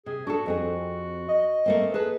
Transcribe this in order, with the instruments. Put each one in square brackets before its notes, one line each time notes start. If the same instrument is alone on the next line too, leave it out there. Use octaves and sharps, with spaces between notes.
[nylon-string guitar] C3 [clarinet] G#4
[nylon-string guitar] D4 A4 [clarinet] F#4
[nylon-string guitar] F2 C4 G#4
[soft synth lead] D#5
[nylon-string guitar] A3 A#3 C4
[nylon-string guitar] G#4 A4 A5 [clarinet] B4